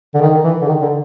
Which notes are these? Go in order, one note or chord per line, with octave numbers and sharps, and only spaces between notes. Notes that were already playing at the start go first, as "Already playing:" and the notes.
D3
D#3
E3
D3
D#3
D3